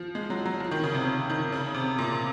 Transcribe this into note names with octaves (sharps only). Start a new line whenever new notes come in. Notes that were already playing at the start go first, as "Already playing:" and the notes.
Already playing: F3
G#3
F#3
F#3
F3
D#3
C#3
C3
C#3
D#3
C#3
C3
A#2